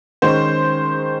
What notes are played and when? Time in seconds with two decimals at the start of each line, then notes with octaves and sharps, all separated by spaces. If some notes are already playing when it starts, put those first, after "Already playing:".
0.22 D#3 G#3 C#4 C5